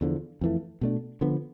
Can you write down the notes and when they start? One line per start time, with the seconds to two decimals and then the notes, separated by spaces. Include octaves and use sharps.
0.01 E2 D3 F3
0.41 F2 E3 A3
0.81 B2 A3 D4
1.21 D3 F3 B3